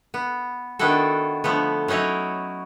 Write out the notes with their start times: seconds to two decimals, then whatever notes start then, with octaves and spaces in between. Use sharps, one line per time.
0.14 B3
0.79 D#3 B3 D4 E4 F#4 A4
1.44 D3 F3 A3 B3
1.88 F#3 C#4 D#4 E4 C#5